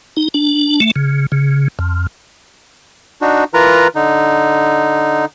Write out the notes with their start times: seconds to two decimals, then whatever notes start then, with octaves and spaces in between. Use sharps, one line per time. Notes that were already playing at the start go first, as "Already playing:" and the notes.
0.17 D#4
0.34 D4
0.80 A3
0.96 C#3
1.32 C#3
1.79 F2
3.21 D4 D#4 F#4
3.54 E3 F4 A#4 B4 A#5
3.95 D3 D#4